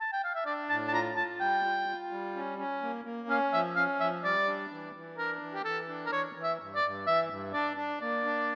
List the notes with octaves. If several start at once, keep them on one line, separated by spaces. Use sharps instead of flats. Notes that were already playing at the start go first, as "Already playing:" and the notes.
A5
G5
F5
E5
D4 D5
A2 A5
A5
F4 A#5
F4 A5
G3 G5
F4
F4
G3
C#4
C#4
A#3
A#3
C#4 F5
F3 E5
C#4 F5
F3 E5
G3 D5
D4
E3
E3
D4 A#4
E3
G4
E3 A4
D4
A#4
E3 C#5
E3
E5
G2
D5
G2
E3 E5
G2
D4 D5
D4
A#3 D5
D4